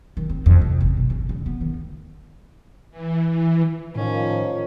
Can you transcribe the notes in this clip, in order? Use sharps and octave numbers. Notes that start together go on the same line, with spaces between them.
D#3
C4
F2
C3
G1
B2
C#3
C#3
B3
D#3
E3
E3
A2 D#3 F3 C#4